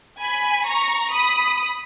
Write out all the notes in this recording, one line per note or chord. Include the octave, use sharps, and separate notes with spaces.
G#5 B5
A#5 C#6
B5 D#6